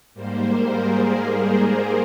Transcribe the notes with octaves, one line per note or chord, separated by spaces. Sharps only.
G#2 G3 A#3 C5
A#4
G#4
A#4
C5